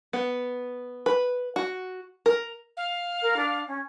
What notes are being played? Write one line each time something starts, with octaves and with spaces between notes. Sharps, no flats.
B3
B4
F#4
A#4
F5
A#4
D4
C#4